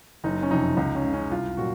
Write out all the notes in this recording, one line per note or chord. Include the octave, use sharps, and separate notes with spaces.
F#1 D#4
C#4
F2 C3 D#4
C#2 D#4
C#4
C#3 G#3
C#4
C2 F4
A#2 F#3 F#4